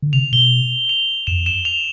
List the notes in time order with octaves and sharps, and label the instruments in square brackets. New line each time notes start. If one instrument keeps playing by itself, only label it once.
[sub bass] D3
[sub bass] C3 [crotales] F7
[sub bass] B2 [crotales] G7
[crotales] F7
[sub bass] F2 [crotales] E7
[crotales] E7
F7